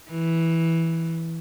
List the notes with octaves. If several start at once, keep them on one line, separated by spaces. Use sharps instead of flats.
E3